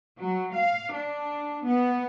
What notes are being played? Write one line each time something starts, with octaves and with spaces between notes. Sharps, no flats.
F#3
F5
D4
B3